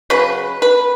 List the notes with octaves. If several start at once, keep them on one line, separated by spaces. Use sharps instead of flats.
C#3 F#3 B4
B4